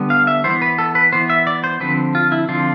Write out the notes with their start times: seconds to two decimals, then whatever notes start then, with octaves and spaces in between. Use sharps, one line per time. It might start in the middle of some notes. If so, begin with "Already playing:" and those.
Already playing: D3 G3 B3
0.10 F5
0.27 E5
0.44 E3 B3 C5
0.62 B4
0.78 A4
0.95 B4
1.12 E3 B3 C5
1.30 E5
1.47 D5
1.64 C5
1.80 D3 F3 C4 B4
2.15 F4
2.32 E4
2.49 D3 F3 C4 F4